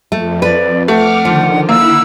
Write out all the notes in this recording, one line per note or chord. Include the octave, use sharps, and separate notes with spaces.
F2 A3
B4 D5
A3 F#5 D6 F6
D3 D#3 F3
A#3 E4 F#5 B5 E6